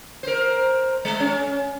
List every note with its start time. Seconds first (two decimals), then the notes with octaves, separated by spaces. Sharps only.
0.23 A#4 C5
1.05 G#3
1.20 C#4